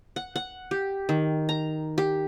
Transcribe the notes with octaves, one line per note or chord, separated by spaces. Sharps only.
F#5
F#5
G4
D#3
A#5
G4